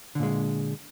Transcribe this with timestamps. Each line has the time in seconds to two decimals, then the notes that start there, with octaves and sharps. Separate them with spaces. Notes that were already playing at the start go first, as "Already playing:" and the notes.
0.15 D3
0.19 A#2
0.23 G#3